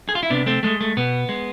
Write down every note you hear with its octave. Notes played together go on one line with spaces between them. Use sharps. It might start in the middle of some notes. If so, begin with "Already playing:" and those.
G#4
F4
E4
C3 B3 D4
A3 C4
G#3 A3
A3
B2 B3
G#3